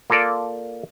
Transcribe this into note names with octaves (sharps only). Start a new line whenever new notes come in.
A#3 F4 A4 A#4 D5